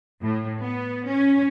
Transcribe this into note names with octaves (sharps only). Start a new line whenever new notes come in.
A2
B3
C#4